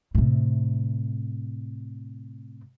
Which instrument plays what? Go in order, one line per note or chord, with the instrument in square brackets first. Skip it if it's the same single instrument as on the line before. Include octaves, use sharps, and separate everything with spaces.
[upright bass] A2 C3